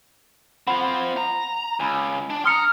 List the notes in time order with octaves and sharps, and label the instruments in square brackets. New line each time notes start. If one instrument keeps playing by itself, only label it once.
[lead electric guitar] C4 F4 [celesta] F#5 B5
[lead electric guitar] A#5
[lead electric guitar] C#2 [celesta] G#5 B5
[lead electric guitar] D4
[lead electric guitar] A#5 C6 [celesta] D#6 C#7 [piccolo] F6